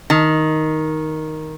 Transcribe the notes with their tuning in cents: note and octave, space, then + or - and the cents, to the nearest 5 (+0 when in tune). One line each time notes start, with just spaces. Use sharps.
D#3 +5